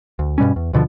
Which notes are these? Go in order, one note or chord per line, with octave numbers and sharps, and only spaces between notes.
D2
G2 B2 G3 C#4
E2
D2 B2 D3 F3